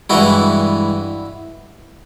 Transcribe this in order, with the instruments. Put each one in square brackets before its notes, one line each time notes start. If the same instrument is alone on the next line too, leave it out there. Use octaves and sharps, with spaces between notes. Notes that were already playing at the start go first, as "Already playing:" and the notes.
[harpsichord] G2 E3 G#3 E4 F#4